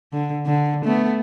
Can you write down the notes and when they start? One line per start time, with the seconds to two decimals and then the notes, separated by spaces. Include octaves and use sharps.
0.13 D3
0.46 D3
0.85 A3 B3